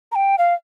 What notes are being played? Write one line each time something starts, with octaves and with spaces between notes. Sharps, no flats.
A#5
G5
F5